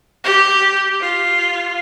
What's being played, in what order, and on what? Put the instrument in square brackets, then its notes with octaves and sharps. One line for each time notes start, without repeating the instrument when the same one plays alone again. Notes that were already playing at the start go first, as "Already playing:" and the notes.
[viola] G4
F4